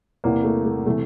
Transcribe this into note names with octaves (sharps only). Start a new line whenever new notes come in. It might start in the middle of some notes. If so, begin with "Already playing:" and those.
E2 C3 E3 A#3
A3
A3
C3 E3 A3